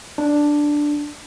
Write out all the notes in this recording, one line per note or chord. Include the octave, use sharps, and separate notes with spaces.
D4